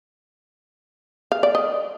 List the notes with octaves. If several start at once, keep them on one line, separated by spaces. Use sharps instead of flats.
F5
D5
D#5